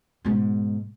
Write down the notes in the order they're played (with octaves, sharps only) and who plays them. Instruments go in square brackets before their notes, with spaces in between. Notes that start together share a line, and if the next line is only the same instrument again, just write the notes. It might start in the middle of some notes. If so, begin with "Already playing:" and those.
[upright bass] G#2 B2